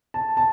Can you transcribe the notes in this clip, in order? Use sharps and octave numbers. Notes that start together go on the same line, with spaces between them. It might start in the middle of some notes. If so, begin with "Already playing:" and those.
A5
A5